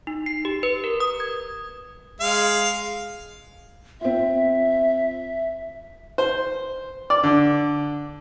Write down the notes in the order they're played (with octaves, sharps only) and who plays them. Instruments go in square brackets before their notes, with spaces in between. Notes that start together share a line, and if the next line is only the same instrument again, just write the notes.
[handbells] D#4
C7
G4
B4
A#4
D#6
G#6
[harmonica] G#3 F5
[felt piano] C4 F4 [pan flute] E5
[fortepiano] C5
D5
D3